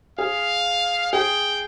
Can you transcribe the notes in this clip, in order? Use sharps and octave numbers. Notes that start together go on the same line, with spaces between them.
G#4 F5
G#4 G5